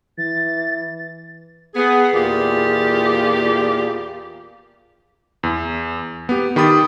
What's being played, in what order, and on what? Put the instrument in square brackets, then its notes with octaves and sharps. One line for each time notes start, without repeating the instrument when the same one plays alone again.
[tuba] E3 [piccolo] A6
[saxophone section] B3 G#4
E2 A#2 F4 G4 G#4 D5
[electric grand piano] E2
B3 G4
D#3 G4 B5 D#6 A6